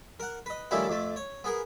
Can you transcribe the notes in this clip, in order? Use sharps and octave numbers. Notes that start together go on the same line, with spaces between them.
A#4 F#5
B4 D#5
D#3 F3 G3 A3 C#4 E4
F2 A3
C#5
B3 G#4 A#4